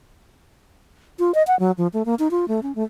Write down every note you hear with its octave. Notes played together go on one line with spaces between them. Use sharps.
F4
D#5
F#5
F#3
F3
A3
A#3
D#4
F4
A3
C#4
A3